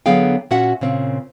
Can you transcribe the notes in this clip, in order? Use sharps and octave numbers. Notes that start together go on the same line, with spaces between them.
D3 F#3 B3 G#4 F5 G5
A#2 C#4 F#4 E5 F#5
A#2 C#3 C4